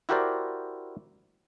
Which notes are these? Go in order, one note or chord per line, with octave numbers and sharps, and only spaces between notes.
E4 F#4 G4 A#4 C5 D5